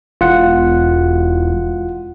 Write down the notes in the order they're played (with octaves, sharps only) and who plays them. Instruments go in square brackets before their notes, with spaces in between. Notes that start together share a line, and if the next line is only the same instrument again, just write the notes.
[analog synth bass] E1 [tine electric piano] F4 F#5